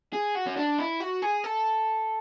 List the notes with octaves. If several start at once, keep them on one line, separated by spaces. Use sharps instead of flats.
G#4
F#4
C#4
D4
E4
F#4
G#4
A4